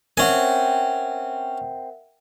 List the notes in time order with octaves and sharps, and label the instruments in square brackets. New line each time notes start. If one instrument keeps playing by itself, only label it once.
[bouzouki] C4 [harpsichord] C#4 G#5 [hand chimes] A#4 E5 F#5